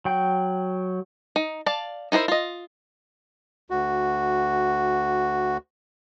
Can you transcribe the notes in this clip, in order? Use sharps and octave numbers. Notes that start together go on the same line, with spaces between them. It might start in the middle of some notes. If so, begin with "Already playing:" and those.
F#3 G5
D#4
D5 F5 A5
D#4 E4 A#4 C5
F4 D#5
D2 F#4